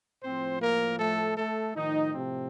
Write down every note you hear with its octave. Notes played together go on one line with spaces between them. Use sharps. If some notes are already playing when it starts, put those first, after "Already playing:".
A2 F3 C4 C5
A#3 A#4
A3 A4
A3 A4
A2 D#3 F3 D#4
C3 C4